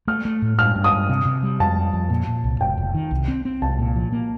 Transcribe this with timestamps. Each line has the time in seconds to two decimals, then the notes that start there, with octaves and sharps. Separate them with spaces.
0.08 A3 F6
0.25 A3
0.42 A2
0.59 G2 F6
0.76 G2
0.84 D#6
0.93 G2
1.10 C3
1.26 C3
1.43 G3
1.60 F2 A5
1.76 G3
1.93 F2
2.10 A#2
2.27 A#2
2.44 C2
2.60 F1 G5
2.77 F1
2.95 D#3
3.11 C2
3.28 C4
3.45 C4
3.62 C2 A5
3.79 A#2
3.96 F3
4.12 A#3